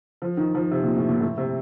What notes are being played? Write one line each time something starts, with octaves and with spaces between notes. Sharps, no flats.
F3
D#3
F3
C3
A#2
A2
A#2
A2
C3